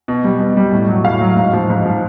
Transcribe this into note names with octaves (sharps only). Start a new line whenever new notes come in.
B2
G3
B2
G3
A2
F#3
A2 F5
F#3
G#2
F3
G#2
F3